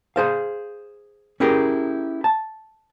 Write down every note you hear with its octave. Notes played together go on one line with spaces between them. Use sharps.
G#4 C5 F5
C#4 E4 G4 G#4 A#4
A5